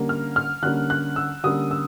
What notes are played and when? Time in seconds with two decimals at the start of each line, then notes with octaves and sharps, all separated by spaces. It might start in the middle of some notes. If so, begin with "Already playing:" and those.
Already playing: D3 G3 A#3 C#4
0.09 F6
0.36 F6
0.62 D3 G3 A#3 C#4 F#6
0.90 F#6
1.16 E6
1.44 D3 G3 A#3 C#4 D#6
1.71 E6